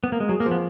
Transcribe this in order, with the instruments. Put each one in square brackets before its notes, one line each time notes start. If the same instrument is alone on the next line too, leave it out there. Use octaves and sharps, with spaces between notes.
[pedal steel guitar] B3
A#3
G#3
[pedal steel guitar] F#3 [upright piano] G#4
[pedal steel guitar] A#3
[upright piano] F3
[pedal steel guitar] B3